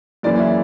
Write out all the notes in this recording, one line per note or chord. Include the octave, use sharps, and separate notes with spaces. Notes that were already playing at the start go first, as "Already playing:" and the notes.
F#2 C#3 E3 A#3 D5
E5